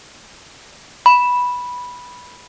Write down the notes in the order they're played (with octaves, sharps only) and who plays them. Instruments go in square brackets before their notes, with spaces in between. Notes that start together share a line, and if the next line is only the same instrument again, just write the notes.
[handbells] B5